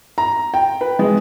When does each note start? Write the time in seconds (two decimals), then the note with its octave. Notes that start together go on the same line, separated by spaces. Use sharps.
0.18 A#5
0.54 G5
0.81 B4
0.99 G#3